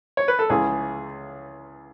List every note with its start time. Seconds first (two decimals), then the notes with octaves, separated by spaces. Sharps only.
0.17 C#5
0.28 B4
0.39 A4
0.50 C#2 C#3 E3 G#4